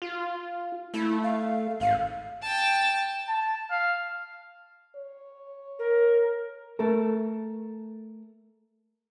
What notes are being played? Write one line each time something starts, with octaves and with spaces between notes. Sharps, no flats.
F4
A3 E4
F5
G#1 F5
G5 A5
A5
F5
C#5
A#4
A3 A4 A#4